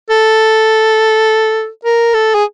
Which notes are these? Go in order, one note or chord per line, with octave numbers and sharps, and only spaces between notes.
A4
A#4
A4
G#4